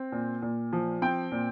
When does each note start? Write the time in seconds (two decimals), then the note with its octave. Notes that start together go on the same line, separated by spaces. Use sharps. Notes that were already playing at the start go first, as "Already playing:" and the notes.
Already playing: C4
0.12 A#2
0.42 A#2
0.73 F3
1.02 C4 G5
1.32 A#2